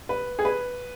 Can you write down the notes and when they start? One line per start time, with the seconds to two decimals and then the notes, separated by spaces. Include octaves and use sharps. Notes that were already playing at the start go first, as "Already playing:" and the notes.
0.09 B4
0.39 G#4
0.45 B4